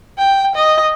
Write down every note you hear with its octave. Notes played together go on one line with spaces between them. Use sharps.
G5
D#5